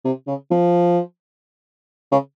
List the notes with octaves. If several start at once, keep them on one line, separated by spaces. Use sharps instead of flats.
C3
C#3
F3
C#3